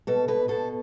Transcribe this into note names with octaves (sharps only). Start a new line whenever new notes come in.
B2 A4
B2 B4
B2 A4